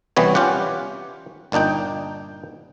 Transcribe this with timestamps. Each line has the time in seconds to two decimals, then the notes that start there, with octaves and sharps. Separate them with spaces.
0.16 C2 B2 E3 G3 B3 C#5
0.35 C#4 F4 G4 F#5
1.52 G1 A#2 D4 D#4 G5